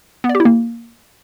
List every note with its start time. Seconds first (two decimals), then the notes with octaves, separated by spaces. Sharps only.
0.24 B3
0.29 D5
0.35 G4
0.40 E4
0.45 A#3